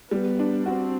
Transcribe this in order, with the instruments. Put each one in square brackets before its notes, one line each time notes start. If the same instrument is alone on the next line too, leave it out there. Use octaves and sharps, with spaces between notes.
[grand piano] G3 [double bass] B3
[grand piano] D4
[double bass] C4 [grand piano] F#4